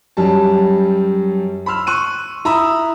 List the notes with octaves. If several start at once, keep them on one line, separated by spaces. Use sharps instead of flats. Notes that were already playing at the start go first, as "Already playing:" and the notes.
F#2 G3 A5
B5 C6 E6 F6
C6 C#6 F#6 D#7
E4 A#5 B5 D#6 E6